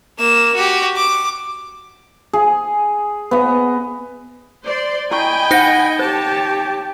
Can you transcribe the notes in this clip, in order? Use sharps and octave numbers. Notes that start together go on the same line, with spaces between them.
A#3 E7
F#4 G4
D6
G#4
B3 D#5
C5 D5 C6
E4 D#5 G5 G#5 B5 C#6
D#4 C5 F#5 A#6
G4 C5 C#5 A5